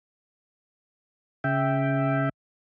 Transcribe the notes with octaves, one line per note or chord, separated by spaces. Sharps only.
C#3 E5 G5